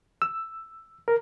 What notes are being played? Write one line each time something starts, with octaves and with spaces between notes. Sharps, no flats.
E6
A#4